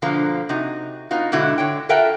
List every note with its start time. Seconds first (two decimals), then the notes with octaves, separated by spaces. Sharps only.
0.02 B2 D3 F3 A#3
0.49 C3 D#4 F#4
1.11 B3 D#4 F4 F#4
1.32 G#2 B2 D3 E4 F#4
1.58 D3 C#5 G5
1.89 F4 A4 A#4 E5 F#5 G5